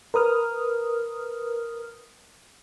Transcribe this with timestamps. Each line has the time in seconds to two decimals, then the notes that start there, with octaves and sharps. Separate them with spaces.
0.14 A#4 B4 D#6 F6